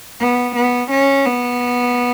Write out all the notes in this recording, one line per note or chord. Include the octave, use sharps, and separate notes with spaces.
B3
B3
C#4
B3